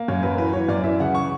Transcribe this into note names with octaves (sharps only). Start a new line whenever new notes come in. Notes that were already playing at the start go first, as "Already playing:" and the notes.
Already playing: A#3
F#2 C#5
F#3 B4
E3 B4
E3 C#5
F#2 D5
E3 E5
C#3 F#5
C#6